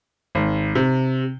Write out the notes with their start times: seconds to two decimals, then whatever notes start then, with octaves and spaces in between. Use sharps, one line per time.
0.35 G#1
0.75 C3